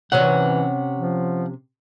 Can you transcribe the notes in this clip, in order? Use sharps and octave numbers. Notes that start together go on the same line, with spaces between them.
C3 E3 C#4 C#5 F#5
F3